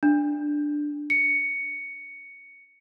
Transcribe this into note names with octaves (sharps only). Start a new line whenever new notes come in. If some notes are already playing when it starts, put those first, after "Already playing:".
D4
C#7